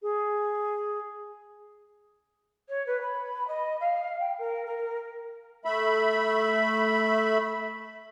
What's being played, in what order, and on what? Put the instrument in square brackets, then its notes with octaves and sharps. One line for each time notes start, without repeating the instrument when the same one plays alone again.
[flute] G#4
[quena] C#5
B4
B5
D#5
F5
G5
A#4
A#4
[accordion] A3 E5 B5